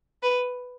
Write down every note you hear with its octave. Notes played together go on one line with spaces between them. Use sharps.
B4